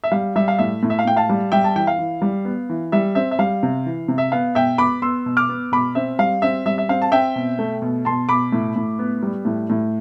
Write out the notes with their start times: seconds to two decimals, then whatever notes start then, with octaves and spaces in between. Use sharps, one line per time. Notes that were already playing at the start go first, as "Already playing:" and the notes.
0.04 E5
0.12 G3 F5
0.36 G3 E5
0.48 F5
0.59 A2 E5
0.83 A2
0.90 E5
0.99 F5
1.06 A2 G5
1.17 F5 A5
1.29 G3
1.52 G3 E5 G5
1.64 A5
1.75 E3 G5
1.87 F5
1.99 E3
2.22 G3
2.45 B3
2.69 E3
2.92 G3 E5
3.15 C4 E5
3.31 E5
3.39 G3 F5
3.63 C3
3.86 E3
4.08 C3
4.18 E5
4.32 B3 F5
4.55 B2 E5 G5
4.78 B3 B5 D6
5.02 B3 C6 E6
5.26 B2
5.37 D6 F6
5.49 B3
5.72 B2 B5 D6
5.95 C4 E5
6.19 G3 F5
6.42 C4 E5
6.66 G3 E5
6.78 E5
6.89 C4 F5
7.02 A5
7.12 C4 E5 G5
7.36 B2
7.59 A3
7.82 B2
8.05 B2 A5 C6
8.29 B2 B5 D6
8.52 A2
8.76 A2
8.99 B3
9.23 G3
9.45 A2
9.70 A2